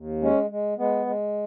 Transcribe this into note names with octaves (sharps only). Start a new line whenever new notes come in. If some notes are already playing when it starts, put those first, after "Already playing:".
Already playing: D#2
G#3 C#4
G#3
G#3 B3
G#3